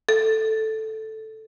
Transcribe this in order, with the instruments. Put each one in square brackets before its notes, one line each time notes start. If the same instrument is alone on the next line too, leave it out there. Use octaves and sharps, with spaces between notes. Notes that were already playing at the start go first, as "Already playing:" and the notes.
[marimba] A4